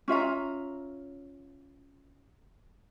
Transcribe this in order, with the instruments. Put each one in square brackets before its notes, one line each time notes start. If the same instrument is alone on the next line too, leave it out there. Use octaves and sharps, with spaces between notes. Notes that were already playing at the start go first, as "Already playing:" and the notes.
[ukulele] C#4 F4 E5 A#5